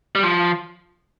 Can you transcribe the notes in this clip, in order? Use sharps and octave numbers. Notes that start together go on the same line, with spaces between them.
G3
F3